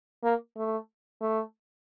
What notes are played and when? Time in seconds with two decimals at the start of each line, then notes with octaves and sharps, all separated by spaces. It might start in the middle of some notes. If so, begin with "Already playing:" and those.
0.23 A#3
0.57 A3
1.21 A3